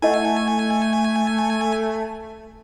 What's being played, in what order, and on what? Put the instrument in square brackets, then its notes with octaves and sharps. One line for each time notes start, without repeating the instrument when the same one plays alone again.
[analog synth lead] A3 [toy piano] E4 D#5 F#5 [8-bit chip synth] G#5